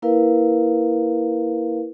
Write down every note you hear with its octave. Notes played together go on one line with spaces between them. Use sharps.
A#3 E4 A#4 B4 F5